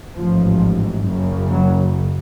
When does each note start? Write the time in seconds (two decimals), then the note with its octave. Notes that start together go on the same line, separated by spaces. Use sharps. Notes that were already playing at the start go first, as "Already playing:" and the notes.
0.16 A1 G#2 F3
1.06 F#1 F#2 C#3
1.51 F#3